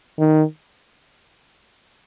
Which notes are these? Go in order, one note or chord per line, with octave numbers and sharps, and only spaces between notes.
D#3